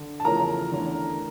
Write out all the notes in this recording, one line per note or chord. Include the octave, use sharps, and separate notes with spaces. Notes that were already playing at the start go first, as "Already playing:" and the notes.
Already playing: D3
A5
E2 C#3 F3 A3 C#4 A#4 A#5
E2 D3 A3 C#4